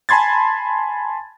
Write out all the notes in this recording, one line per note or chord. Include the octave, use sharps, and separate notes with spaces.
G#5 A5 B5 C6 G#6 A6